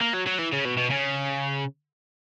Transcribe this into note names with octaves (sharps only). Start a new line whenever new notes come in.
A#3
F#3
F#3
E3
C#3
B2
B2
C#3